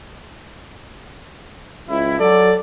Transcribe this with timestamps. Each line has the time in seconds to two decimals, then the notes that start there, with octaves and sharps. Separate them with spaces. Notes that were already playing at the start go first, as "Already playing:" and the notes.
1.89 C#2 E4
2.19 F#3 A4 D5